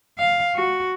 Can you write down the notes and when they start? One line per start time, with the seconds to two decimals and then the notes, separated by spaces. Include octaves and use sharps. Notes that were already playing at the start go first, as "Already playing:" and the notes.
0.19 F5
0.56 F#4